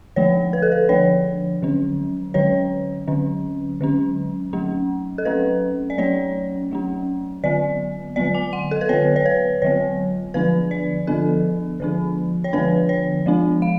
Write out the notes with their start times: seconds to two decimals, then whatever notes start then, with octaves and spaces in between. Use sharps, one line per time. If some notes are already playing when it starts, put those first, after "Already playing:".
0.16 D3 F3 A3 D4 C#5
0.53 B4
0.62 A4
0.72 B4
0.89 D3 F3 A3 D4 C#5
1.62 D3 F#3 C#4
2.34 D3 F#3 C#4 C#5
3.08 D3 F#3 C#4
3.81 D3 F#3 C#4
4.53 F#3 A3 C#4
5.18 A4
5.25 F#3 A3 C#4 B4
5.90 D5
5.98 F#3 A3 C#4 C#5
6.71 F#3 A3 C#4
7.44 D3 F#3 B3 D5
8.16 D3 F#3 B3 D5
8.34 G#5
8.53 F#5
8.71 A4
8.81 B4
8.89 D3 F#3 B3 C#5
9.16 C#5
9.26 B4
9.62 D3 F#3 B3 C#5
10.34 D3 F3 B3 D4 B4
10.71 D5
11.07 D3 F3 B3 D4 A4
11.80 D3 F3 B3 D4
12.44 C#5
12.53 D3 F3 B3 D4 B4
12.89 C#5
13.26 F3 G#3 B3 D4
13.62 F5